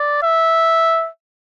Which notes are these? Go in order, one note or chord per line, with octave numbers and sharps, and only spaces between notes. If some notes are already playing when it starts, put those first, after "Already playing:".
Already playing: D5
E5